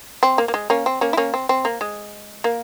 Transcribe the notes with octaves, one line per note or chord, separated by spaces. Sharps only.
C4
A#3
A#3
G#3
A#3 C#4
C4
A#3 C#4
E4
A#3 C#4
C4
C4
A#3
G#3
A#3